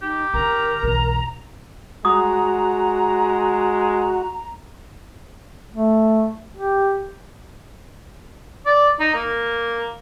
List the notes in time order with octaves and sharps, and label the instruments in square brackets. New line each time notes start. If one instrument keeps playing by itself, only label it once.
[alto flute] D#4 [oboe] G4
[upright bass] D3 [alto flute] A#4 [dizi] A#5
[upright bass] B1 E2
[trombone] G#3 [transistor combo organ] F#4 [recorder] A#5 [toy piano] D#6
[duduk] A3
G4
[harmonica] D5
D#4
A#3